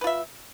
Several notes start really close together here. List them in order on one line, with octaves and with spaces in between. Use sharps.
B4 F4 E5